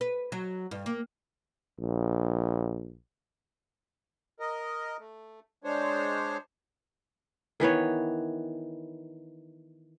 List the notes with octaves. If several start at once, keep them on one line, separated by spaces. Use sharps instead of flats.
B4
F#3
G2
A#3
A#1
A#4 D#5
A3
G#3 D4 C5 C#5
D#3 E3 B3 C#5